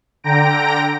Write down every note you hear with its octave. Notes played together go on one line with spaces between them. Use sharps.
D3 G5 A#5 A#6 D7